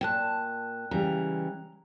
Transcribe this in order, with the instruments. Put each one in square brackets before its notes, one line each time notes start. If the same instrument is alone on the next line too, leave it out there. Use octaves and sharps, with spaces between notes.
[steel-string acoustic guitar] A#2 A#4 A5 [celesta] G5 F#6
[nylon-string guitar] C#3 E3 G3 [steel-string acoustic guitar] A#5